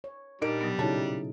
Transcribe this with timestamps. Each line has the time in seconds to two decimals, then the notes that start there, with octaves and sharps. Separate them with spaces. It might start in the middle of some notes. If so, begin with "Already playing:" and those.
0.04 C#5
0.42 A#2 G3 D4 D#4 A#4 D7
0.61 B2 F#3 B3
0.79 C#3 D#4 E4 F#4 A4 C#5 A5